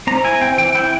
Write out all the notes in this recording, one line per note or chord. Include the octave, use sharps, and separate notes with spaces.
C4 A#5
E4 G#5
C4 G5
E3 G5
E4 G5